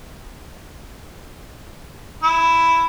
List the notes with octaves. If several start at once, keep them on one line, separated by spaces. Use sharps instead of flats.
E4